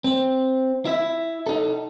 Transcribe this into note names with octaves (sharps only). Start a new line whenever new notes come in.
C4
E4 E5
D#4 A4